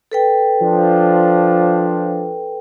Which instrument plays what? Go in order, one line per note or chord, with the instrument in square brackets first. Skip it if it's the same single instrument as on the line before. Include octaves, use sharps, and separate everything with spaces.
[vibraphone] A4 B4 G5
[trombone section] F3 D4